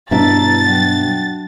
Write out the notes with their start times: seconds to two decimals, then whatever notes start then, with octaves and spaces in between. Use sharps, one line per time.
0.11 G2 B2 D4 E4 E5 A#5 A6
0.66 F#3 F#4 G5